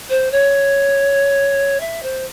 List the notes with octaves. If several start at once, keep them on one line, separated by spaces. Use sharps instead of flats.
C5
C#5
E5
C5